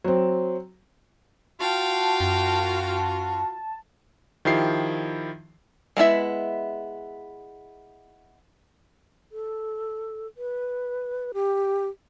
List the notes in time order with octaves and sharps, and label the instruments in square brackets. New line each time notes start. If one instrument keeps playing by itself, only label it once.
[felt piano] F#3 C4
[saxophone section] F4 F#4 [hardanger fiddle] F5 G5 [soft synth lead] A5
[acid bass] F#2
[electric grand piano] D#3 F3 E4 G4 C7
[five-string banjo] G#3 B3 E4 E5
[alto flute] A4
B4
G4